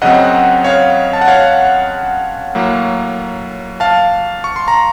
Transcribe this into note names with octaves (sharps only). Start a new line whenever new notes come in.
F#2 C#3 F#3 C4 D#5 F#5
C#5 F5
A5
F#5
C#5 F5
A2 F#3 A#3
F5 A5
C#6
C6
A#5